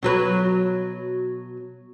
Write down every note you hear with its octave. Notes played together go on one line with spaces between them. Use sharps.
B2 F#3 B4